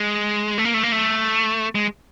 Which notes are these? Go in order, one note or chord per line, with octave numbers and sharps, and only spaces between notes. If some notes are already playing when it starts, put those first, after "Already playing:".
Already playing: G#3
A3
A#3
A3
A#3
A3
G#3